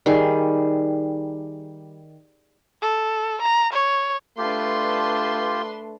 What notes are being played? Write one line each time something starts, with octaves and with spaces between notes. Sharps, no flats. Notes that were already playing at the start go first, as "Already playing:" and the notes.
D#3 G3 G#4
A4
A#5
C#5
A3 D4 F4 G4 B4 C6